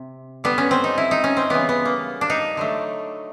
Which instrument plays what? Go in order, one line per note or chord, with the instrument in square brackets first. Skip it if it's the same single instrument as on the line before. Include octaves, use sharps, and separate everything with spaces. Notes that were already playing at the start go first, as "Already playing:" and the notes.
Already playing: [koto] C3
D3 G3 B3
C#4
C4
D#4
E4
D#4
C#4
C4
C#3 E3 G3 B3
B3
A#3
D4
D#4
D3 F#3 A3